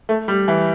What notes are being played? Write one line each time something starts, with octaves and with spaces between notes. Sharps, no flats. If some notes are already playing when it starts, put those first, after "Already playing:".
A3
G3
E3